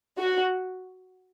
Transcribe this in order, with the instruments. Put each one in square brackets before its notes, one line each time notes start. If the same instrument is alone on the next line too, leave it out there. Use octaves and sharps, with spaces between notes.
[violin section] F#4